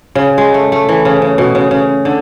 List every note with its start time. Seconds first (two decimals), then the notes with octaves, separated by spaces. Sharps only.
0.15 C#3
0.38 G#3
0.54 A3
0.72 A3
0.89 E3
1.05 C#3
1.22 C#3
1.38 B2
1.55 C#3
1.71 C#3
2.05 D3